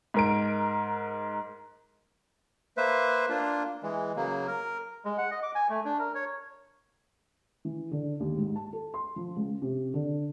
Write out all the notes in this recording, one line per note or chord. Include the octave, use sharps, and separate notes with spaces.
G#2 A#4 D7
A#3 B4 C5 E5
A#3 D4 F4
E3 G#3
C#3 F#3 A#3
A#4
G#3
F#5
D#5
D6
G#5
A3
D4
A#4
C#5
E3
D3
D#2
G#2
A5
A4
C6
F3
C#2
C3
D3